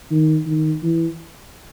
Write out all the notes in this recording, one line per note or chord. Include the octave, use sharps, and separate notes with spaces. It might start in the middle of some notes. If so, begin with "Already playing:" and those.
D#3
D#3
E3